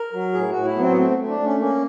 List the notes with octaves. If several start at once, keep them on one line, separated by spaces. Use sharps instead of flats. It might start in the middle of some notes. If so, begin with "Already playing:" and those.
Already playing: A#4
F#3
A2 G#4
F#4
A2
E4
F#3 B3 C4
B3
A3 C4
A3
D4
A3
C#4
A#3 C#4